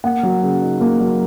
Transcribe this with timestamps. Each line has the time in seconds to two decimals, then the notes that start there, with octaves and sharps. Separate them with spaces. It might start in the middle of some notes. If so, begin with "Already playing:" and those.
0.04 A#3 F#5
0.23 F#3
0.43 C#3
0.62 D#4
0.81 A#3
1.00 F#3